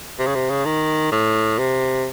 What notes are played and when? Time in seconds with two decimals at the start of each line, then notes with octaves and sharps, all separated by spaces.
0.19 C3
0.27 C#3
0.35 C3
0.50 C#3
0.65 D#3
1.12 A2
1.59 C3